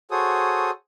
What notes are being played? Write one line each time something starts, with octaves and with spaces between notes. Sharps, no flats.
F#4 G#4 A4 C5 C#5 D#6